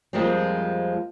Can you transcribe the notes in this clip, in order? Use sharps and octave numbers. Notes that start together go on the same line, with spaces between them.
F2 F3 G3 G#3 A#3 C4